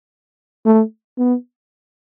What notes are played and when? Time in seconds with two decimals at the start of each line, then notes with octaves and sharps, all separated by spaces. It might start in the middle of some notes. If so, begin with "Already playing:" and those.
0.65 A3
1.18 B3